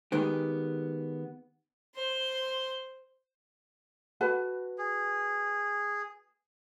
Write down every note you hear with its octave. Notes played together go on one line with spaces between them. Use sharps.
D#3 G#3 B3 G4
C5 C6
F#4 B4 A5
G#4